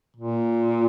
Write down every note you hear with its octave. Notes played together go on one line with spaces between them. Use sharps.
A#2